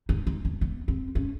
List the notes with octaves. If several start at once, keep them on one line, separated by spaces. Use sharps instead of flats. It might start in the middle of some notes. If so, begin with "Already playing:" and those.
D#4
D#4
B3
B3
C4
C#4